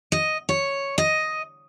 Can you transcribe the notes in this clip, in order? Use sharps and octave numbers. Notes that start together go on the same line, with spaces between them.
D#5
C#5
D#5